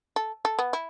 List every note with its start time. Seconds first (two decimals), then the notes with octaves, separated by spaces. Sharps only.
0.16 A4
0.45 A4
0.59 B3
0.73 E4